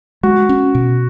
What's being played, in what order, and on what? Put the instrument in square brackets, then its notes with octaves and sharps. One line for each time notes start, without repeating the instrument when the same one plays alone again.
[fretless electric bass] G#3 [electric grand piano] F#4
[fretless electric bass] C#4
B2